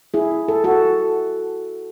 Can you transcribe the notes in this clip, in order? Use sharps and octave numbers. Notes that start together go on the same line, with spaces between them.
E4 G#4
A4
F#4 A4